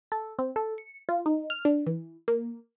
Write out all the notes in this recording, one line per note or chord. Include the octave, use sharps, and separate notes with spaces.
A4
C4
A4
C#7
F4
D#4
F6
D4
E3
A#3